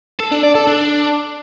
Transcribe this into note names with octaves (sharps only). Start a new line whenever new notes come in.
A4
D4
D5
A4
D4